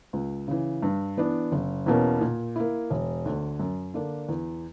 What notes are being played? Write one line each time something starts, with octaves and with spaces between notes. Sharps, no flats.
C#2
C#3 E3
G2
E3 B3 D4
F#1
E2 B2 A#3 C#4
A#2
A#3 E4
E1
D2 D3
F#2
D3 A#3 D4
E2